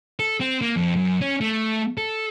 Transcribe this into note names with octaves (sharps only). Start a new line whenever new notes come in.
A4
C4
A#3
F2
F#2
C#4
A3
A4